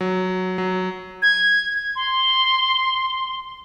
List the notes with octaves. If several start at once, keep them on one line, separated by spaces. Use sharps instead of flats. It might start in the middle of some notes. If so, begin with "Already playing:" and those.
F#3
F#3
G#6
C6